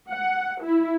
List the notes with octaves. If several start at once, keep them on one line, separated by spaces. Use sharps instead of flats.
F#5
E4